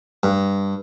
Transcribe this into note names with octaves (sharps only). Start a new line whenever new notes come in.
G2